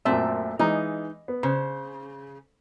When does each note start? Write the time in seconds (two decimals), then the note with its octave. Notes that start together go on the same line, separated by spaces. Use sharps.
0.05 F#2 A#2 A3 C4 E5
0.59 E3 G#3 D#4 A#5
1.28 B3
1.43 C#3 C5